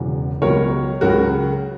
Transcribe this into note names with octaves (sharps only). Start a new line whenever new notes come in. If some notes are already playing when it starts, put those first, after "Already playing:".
Already playing: E1 E2 C#3 F#3
C#2 B2 F#3 A#4 C#5
C#2 C#3 F#3 F#4 A#4